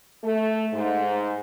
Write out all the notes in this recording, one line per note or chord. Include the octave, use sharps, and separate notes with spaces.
A3
G#2